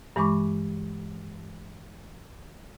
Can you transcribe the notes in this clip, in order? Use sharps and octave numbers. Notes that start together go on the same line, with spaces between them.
G2 E3 G#3 B5 C#6 D6